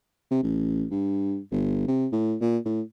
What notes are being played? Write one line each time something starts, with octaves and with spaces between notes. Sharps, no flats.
C3
A1
G2
G1
C3
A2
A#2
A2